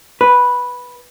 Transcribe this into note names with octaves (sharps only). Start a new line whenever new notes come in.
B4